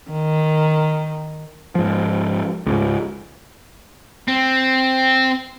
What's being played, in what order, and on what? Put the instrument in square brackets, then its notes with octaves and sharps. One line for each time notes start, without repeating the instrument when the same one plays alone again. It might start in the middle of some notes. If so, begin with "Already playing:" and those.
[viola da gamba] D#3
[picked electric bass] G#2 F3
C#2 G#2
[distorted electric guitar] C4